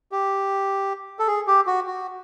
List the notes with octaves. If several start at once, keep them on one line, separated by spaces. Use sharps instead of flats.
G4
A4
G#4
G4
F#4
F#4